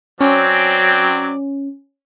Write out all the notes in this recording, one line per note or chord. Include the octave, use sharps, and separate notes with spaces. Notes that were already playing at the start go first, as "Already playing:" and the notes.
F#3 C4 C#4 D5